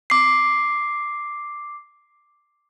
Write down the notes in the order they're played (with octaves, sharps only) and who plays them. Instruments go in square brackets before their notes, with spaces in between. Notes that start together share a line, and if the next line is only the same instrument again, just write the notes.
[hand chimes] D6 C7